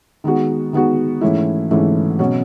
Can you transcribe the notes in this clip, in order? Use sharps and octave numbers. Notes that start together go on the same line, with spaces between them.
D#3 G#3 B3 F#4
D#3 G#3 B3 F#4
G#2 E3 A3 C#4 E4
G#2 E3 A3 C#4 E4
B2 F#3 C#4 F#4